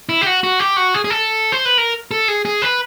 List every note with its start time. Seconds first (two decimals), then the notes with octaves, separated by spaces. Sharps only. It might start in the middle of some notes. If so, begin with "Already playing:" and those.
0.09 E4
0.21 G4
0.27 F#4
0.43 F#4
0.59 G4
0.77 F#4
0.94 G#4
1.05 G#4
1.10 A4
1.52 C5
1.65 B4
1.78 A#4
2.11 A4
2.28 G#4
2.45 G#4
2.62 B4